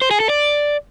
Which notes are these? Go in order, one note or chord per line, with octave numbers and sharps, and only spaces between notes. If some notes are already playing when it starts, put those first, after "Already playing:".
C5
G#4
A4
D5